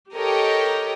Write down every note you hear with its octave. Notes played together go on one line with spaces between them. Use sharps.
G4 A4 A#4 C#5 D#5 G5